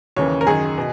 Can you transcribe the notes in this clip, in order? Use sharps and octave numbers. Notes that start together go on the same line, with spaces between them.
D#2 C#3 E3 C#5
A#4
F#2 D#3 G#4
B2